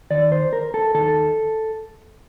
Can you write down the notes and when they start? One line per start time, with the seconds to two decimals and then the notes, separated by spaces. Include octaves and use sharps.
0.10 D#2 D#3 D5
0.32 C5
0.53 A#4
0.74 A4
0.95 D#2 D#3 A4